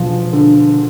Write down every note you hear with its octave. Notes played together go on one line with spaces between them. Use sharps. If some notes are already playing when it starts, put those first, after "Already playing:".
Already playing: E1 F3
D3